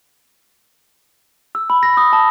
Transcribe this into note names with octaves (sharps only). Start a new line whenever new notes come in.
E6
B5
A#6
D#6
A5